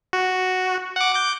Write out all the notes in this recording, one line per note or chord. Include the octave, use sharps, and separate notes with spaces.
F#4
F#5 D6
D6 G6